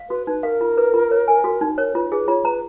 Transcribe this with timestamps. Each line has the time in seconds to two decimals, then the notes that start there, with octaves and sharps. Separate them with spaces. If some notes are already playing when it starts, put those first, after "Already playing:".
Already playing: F5
0.10 F#4 B4
0.27 D#4 B4
0.43 A#4 F5
0.61 F4
0.77 B4
0.94 F4
1.11 C#5
1.28 G#5
1.44 F#4
1.61 D#4
1.77 A#4 C#5
1.95 F4 B4
2.11 G#4 B4
2.28 F4 C#5
2.45 B4 A#5